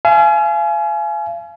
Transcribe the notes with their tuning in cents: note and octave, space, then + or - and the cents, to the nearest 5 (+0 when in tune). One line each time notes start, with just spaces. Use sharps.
F5 -35 G#5 +30